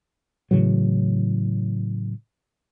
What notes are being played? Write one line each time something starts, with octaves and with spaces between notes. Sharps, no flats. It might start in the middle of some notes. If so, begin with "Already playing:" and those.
A2 C#3 E3 F#3